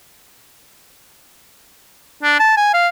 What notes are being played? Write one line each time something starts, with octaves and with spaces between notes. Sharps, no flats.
D4
A5
G#5
F5